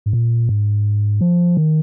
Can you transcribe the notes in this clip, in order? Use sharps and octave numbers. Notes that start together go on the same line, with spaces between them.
G#2
A#2
G#2
F3
D#3